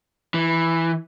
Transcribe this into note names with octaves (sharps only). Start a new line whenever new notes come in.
E3